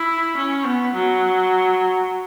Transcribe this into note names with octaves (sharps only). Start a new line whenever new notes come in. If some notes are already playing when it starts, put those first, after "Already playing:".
Already playing: E4
C#4
B3
F#3